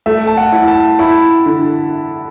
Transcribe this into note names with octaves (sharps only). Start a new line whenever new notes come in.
A3 E5
A5
F#5
E4
A5
E4 B5
D3